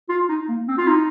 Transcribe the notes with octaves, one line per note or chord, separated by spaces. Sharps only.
F4
D#4
A#3
C4
F4
D#4